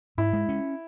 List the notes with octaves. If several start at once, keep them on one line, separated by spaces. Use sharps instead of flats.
G#2 E4
G#3
C#4